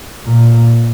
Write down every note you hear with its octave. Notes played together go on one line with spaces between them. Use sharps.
A#2